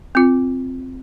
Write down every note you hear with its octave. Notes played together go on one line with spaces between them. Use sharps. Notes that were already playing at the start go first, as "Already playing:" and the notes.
C4 F4